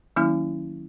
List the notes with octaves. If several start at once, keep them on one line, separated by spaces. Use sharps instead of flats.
D#3 F#3 A#3 C#4 E4 F6